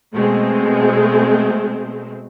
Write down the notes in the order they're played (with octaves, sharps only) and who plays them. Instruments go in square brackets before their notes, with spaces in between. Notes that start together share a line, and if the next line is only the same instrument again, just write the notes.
[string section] B2 G#3 A3 C4